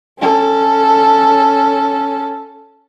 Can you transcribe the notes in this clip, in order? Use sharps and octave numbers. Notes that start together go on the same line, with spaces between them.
C#4 A4